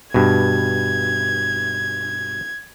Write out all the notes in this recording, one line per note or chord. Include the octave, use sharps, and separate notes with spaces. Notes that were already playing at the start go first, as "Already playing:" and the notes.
G2 B2 G#6